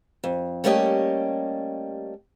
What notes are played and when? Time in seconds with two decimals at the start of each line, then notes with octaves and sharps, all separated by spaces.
0.24 F2
0.64 G3 A3 A#3 C#4 G4 D#5